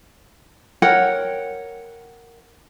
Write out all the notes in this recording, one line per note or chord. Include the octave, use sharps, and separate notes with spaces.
A#4 C#5 F#5 G5